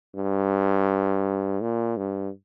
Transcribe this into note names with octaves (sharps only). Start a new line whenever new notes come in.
G2
A#2
G2